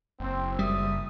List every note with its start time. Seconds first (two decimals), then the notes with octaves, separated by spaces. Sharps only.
0.20 F#1 C4
0.59 G3 E5 D#6